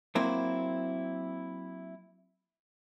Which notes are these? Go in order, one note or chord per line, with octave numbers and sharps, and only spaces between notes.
F#3 A#3 C4 E4